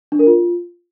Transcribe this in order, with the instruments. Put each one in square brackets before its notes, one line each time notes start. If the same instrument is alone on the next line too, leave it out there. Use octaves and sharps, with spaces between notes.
[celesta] D4
A#4
F4